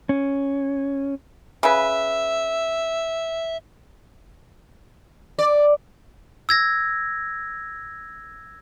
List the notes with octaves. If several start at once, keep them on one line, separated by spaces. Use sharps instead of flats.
C#4
C#3 B4 E5
D5
E6 G#6 A#6